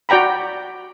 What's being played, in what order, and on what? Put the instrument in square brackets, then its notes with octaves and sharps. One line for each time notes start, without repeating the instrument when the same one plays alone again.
[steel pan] F#4 D5 G5 A#5 B5